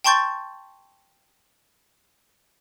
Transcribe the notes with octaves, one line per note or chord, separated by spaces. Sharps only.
G5 A5 C6 C#6 G6 A6